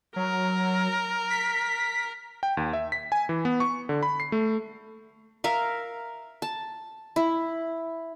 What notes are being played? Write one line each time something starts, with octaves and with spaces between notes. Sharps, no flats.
F#3 A#4
B6
G5
D#2
E5
B6
G#5
E3
B3
C#6
D3
B5
C7
A3
A#4 E5 F5
A5
E4